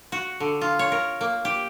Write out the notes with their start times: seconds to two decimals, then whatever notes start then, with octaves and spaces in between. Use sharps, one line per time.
0.12 F#4
0.40 D3
0.61 F4
0.79 C#5
0.92 A#4
1.21 A#3
1.45 G4